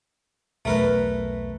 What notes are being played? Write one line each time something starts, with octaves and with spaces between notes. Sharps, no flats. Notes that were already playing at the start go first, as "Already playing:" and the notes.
B1 E2 A3 A#4 B4